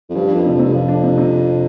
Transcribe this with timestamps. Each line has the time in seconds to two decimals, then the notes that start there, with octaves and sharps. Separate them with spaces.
0.10 F2
0.15 G2 F3
0.31 F2 D4
0.45 C3
0.55 F2
0.59 G2 C3
0.72 F2 F3
0.88 D4
1.04 C3
1.18 C3